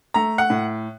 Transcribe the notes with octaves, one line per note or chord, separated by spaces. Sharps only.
A3 A#5
F#5
A2